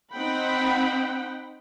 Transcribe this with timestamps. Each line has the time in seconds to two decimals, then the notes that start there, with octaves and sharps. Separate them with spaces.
0.13 C4 D#4 F#5 G5 B5